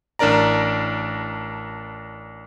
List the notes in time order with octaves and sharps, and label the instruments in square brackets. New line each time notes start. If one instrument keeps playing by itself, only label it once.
[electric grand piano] A1 D4 A#4 D5 A#5